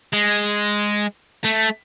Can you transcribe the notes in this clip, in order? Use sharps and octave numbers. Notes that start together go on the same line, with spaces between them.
G#3
A3